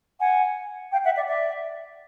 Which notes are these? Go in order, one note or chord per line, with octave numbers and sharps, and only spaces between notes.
F#5 G#5
F5 G5
E5 F#5
D5 E5
D5 E5